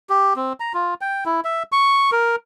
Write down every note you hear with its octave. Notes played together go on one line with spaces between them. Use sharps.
G4
C4
A#5
F4
G5
E4
E5
C#6
A#4